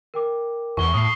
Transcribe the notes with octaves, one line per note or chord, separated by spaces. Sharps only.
A#4 G5 D6
E2 C#6 G7
A2 D#6 C7